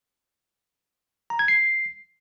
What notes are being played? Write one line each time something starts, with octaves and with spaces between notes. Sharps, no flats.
A#5
G#6
C7